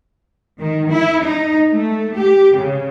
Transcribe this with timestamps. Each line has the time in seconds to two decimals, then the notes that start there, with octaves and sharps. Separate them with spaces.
0.59 D#3
0.89 E4
1.23 D#4
1.71 A3
2.16 G4
2.55 C#3